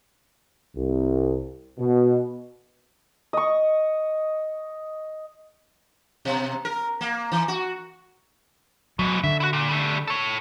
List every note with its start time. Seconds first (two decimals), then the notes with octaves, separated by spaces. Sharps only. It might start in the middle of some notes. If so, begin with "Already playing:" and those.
0.77 C2
1.79 B2
3.33 D#5 C#6
6.25 B2
6.65 A#4
7.01 A#3
7.32 E3
7.48 F#4
8.99 G#2 B2 F#3
9.24 D3 E5
9.40 E4 F#4
9.53 A#2
9.69 G3 A3
10.08 A4 C#5